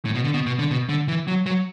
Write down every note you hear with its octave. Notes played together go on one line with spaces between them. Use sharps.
A2
B2
D3
B2
B2
D3
B2
D3
E3
F#3
F#3